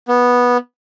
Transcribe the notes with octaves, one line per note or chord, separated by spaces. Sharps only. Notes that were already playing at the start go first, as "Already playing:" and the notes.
B3